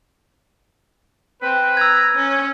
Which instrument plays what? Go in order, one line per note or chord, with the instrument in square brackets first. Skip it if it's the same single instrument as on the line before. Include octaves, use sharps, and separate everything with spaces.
[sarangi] C4 [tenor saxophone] B4
[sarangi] A#5 [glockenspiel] E6 G#6
[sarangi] C#4